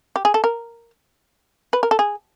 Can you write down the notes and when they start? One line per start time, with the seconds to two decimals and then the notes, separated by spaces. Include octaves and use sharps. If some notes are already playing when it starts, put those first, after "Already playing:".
0.16 G4
0.25 G#4
0.34 A4
0.44 A#4
1.73 B4
1.83 A#4
1.91 A4
1.99 G#4